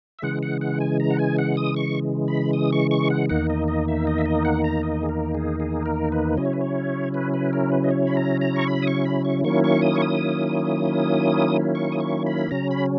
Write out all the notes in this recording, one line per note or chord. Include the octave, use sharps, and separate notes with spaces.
E5
C#3 E3 G#3 F#5
F#5
F#5
G#5
A#5
F#5
G#5
F#5
D#6
C#6
B5
D#6
C#6
C#6
F#5
E2 D#3 A#3 D#4 F#5
D#5
D#5
E5
D#5
E5
D#5
F#5
A#5
D#5
G#4
A#4
G#4
G#4
A#4
B4
C#3 F#3 C#4 E4 D#5
C#5
B4
C#5
B4
B4
A#4
B4
D#5
C#5
B5
A#5
A#5
C#6
B5
D#6
C#6
B5
C#6
D#3 F#3 A#3 C#4 E4 C#6
C#6
D#6
C#6
D#6
C#6
D#6
C#6
B5
C#3 F#3 C#4 A#5
B5